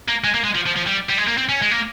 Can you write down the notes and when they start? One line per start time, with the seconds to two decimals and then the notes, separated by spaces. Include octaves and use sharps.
0.08 A#3
0.24 G#3
0.34 A#3
0.44 G#3
0.55 F3
0.66 F3
0.76 F3
0.87 G3
1.09 G3
1.18 G#3
1.28 A#3
1.37 C4
1.49 C#4
1.62 G#3
1.71 A#3